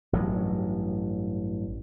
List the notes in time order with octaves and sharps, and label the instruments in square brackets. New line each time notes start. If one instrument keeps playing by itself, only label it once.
[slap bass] A1 G2 F#3